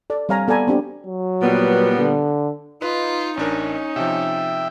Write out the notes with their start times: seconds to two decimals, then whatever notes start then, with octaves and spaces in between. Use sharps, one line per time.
0.10 A4 D5
0.29 G3 C4 C#5 F5 G#5 A#5
0.48 B3 A4 D5 G#5 A#5 B5
0.68 C4 D4 G4
1.06 F#3
1.42 A#2 G3 B3
1.98 D3
2.82 D#4 F4 B4
3.37 A1 C#4 D4 A#4
3.96 C3 F3 E5 G5